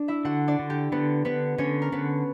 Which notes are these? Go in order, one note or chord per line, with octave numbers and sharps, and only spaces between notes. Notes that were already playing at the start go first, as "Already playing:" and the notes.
Already playing: D4 D5
E4 E5
D3 F#4 F#5
D4 D5
D3
G4
D3 B3 B4
D3 B3 B4
D3 C#4 C#5
A#4
D3 B3 B4